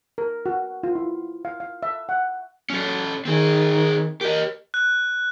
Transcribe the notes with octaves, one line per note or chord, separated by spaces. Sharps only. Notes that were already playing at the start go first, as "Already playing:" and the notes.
A#4
F#4
F4
E4
F5
F5
E5
F#5
F#3 C#4 A4
D#3 C4 G#4
G4 A#4 D#5
F#6